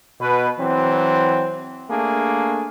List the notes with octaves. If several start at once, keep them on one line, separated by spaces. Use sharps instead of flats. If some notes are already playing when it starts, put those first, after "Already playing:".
B2 B4
E3 F#3 C4
A3 A#3 D4 G#4